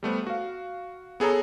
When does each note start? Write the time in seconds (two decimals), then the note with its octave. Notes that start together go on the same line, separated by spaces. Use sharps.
0.03 G3 A3 B3 C5
0.27 F#4 F5
1.20 B3 G#4 A4 C#5 A#5